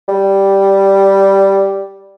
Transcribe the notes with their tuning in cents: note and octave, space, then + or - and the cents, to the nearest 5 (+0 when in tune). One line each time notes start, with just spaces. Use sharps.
G3 -5